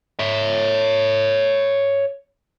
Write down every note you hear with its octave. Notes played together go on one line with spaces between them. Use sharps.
C#5 E5